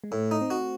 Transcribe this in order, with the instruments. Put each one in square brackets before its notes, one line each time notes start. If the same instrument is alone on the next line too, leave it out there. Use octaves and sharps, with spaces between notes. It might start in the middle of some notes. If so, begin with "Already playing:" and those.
[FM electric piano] G#3
[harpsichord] A2 [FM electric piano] A3
[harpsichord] D#4
[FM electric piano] C4
[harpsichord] F#4